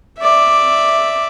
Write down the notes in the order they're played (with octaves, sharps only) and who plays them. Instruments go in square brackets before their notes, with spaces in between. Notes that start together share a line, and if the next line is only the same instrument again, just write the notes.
[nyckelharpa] D5 E5